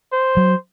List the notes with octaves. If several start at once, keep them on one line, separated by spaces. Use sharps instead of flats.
C5
F#3